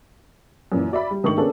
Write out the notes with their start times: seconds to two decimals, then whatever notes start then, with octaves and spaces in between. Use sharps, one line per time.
0.72 F#2 A#2 E3
0.92 F#4 D5 E5 B5
1.11 G3
1.23 G#2 D#3 A3 D4 C#6 F#7
1.38 A#3 B3 C#4 D4 G#4 A4